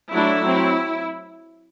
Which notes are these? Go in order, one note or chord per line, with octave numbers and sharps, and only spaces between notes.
F#3 A3 D4 E4
F#3 C4